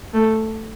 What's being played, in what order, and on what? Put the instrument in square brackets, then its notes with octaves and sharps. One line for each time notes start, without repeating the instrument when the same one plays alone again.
[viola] A3